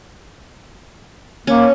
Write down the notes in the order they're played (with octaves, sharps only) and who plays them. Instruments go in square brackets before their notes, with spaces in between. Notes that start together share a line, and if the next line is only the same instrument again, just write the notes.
[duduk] A#3 [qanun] C#4